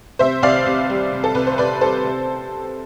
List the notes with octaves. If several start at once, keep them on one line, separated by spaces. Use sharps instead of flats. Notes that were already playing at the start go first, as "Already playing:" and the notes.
C3 C5 E5
C2 D5 F5
C2
G3
C3
A4
C2 B4
C5
C2 B4 D5
G3 A4 C5
C3